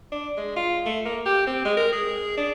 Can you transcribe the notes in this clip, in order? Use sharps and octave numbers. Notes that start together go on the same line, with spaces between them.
D4
G#3
F4
A3
A#3
G4
C4
G#3
A#4
G#4
D4